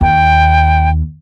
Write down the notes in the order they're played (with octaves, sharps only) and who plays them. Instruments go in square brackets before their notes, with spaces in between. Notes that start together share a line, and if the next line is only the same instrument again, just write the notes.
[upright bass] D#2 [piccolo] G5